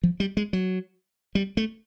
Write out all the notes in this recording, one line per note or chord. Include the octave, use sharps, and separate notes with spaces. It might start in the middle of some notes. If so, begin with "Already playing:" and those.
F3
G3
G#3
F#3
G3
A3